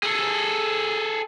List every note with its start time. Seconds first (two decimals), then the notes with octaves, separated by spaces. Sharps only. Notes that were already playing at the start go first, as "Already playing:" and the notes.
0.03 G#4 A4